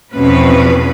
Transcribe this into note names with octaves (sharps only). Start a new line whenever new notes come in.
E2 B2 F3 C4 C#4 B4